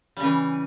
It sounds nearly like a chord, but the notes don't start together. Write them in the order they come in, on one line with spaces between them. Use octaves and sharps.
G3 C#3 E3